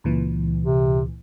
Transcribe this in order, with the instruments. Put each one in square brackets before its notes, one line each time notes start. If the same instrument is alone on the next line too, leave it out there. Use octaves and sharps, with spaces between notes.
[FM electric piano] C#2 A#2 E3
[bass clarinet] C3